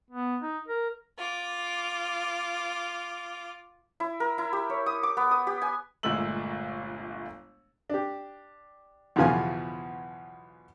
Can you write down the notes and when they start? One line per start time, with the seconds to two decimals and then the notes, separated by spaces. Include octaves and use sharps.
0.11 B3
0.42 D#4
0.68 A#4
1.18 F4 D6
4.00 E4
4.20 A#4
4.38 E4
4.53 G4
4.70 C#5
4.86 D#6
5.03 D6
5.17 B3
5.31 D#6
5.47 G4
5.62 G#5
6.03 G1 A#2 G#3 A3 E6 F#7
7.90 D4 G4
9.16 B1 E2 C#3 F3 F4 G#5